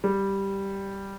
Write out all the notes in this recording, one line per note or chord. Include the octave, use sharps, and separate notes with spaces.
G3